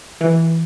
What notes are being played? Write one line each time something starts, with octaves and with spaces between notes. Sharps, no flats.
E3